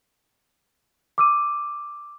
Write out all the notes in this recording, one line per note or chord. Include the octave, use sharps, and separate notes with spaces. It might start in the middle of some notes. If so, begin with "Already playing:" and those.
D6 E6 D#7